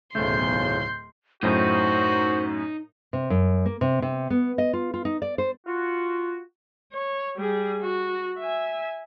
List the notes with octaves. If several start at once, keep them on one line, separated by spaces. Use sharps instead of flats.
D1 B1 E2 C#3 A3 C6 G6
F#2 A2 D#4 F#4 C5
C3
F#2
A#3
C3
C3
B3
D#5
F4
F4
D#4
D5
C5
F4 F#4
C#5
G3 G#4
F#4
E5 G#5